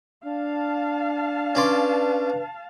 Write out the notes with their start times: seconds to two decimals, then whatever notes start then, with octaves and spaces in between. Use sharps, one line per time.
0.25 D4 F5 A5
1.55 C#4 B4 D5 C6